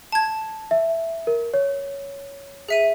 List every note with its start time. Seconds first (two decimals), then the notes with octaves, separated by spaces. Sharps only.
0.12 A5 G#6
0.71 E5
1.27 A#4
1.54 C#5
2.69 G#4 E5 D#7